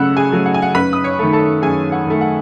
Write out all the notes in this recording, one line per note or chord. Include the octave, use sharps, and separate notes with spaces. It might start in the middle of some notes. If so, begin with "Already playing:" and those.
Already playing: C#3 F#3 A3 F#5 B5 E6 F#6
G#4 G#5
F#3 A3
F#5
G#5
F#5
F#2 B4 B5
D#6
C#5 C#6
D#3 A3
A4 A5
F#2 G#4 G#5
F#5
D#3 A3
F#5